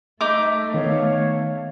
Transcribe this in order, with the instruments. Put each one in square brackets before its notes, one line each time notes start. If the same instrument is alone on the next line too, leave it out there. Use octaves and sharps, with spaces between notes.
[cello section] A3 [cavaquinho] D#4 D6 [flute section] E5
[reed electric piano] D#3 B3 [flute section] C#5 F5